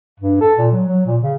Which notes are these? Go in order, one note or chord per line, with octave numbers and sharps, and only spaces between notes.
G2
A4
A#2
F#3
F#3
A#2
C#3